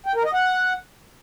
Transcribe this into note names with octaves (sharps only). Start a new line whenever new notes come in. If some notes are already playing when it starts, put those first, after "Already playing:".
G5
A#4
D#5
F#5